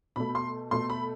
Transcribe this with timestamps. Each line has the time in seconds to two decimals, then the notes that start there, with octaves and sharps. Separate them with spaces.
0.16 B2 A3 B5
0.35 C6
0.71 B2 A3 C6
0.90 B5